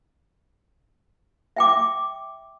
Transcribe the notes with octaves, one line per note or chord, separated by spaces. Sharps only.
E5 G5 D6